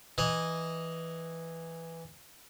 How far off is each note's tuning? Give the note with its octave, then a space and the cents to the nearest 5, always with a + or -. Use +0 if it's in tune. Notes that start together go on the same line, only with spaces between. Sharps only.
E3 +0 D#5 +0